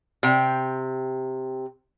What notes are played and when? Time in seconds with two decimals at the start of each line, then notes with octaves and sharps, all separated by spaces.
0.23 C3 G5